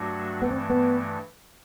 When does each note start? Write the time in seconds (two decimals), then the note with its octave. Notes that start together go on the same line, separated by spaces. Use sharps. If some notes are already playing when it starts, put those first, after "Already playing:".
Already playing: G2 F#3 A3 D4 F#4
0.42 G2 E3 A3 B3
0.51 C4
0.70 B3